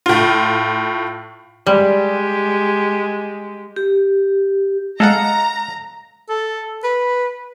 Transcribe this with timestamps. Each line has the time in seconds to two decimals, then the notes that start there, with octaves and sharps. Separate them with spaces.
0.06 A2 F4
1.67 G3 G#3 G4
3.76 G4
5.00 G#3 A4 D#5 F5 F#5 A#5
6.29 A4
6.84 B4